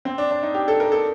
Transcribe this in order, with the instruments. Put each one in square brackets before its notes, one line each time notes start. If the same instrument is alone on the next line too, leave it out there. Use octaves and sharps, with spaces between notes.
[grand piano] C4
D4
D4
D#4
G4
A4
A#4
A4